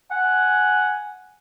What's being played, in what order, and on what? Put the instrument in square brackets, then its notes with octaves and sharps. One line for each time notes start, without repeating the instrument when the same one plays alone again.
[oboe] F#5 [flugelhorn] G#5